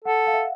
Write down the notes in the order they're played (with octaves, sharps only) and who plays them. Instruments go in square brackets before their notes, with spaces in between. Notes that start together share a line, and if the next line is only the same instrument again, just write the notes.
[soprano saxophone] A4 [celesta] F#5
[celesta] F5
E5